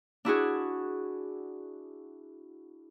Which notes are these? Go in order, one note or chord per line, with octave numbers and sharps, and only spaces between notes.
D4 E4 F#4 G#4